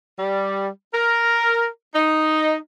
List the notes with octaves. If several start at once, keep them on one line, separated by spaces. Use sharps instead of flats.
G3
A#4
D#4